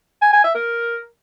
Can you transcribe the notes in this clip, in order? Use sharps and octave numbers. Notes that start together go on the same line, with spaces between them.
G#5
G#5
E5
A#4